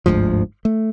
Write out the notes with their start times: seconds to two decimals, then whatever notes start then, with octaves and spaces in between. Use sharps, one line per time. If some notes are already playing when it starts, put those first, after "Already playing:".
0.06 G1 D2 G#2 F3
0.65 A3